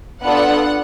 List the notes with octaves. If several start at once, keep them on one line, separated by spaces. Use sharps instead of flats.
B3 D4 F4 A4 F#5